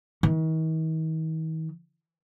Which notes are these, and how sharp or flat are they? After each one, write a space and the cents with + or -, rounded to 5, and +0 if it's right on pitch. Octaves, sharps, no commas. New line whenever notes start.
D#3 +45